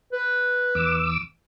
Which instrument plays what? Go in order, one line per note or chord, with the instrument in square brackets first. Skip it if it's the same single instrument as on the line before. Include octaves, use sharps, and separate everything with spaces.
[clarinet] B4
[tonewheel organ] E2 D6 E6